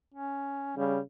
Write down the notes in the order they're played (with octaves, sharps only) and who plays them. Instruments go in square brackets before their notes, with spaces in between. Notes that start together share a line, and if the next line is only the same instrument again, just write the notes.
[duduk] C#4
[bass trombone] C#3 [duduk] G3